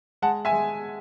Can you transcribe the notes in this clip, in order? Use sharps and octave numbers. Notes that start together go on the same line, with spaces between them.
G#3 F#5 A5
E5 G#5
G#3